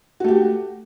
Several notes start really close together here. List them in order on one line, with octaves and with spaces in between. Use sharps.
F#4 A3 G4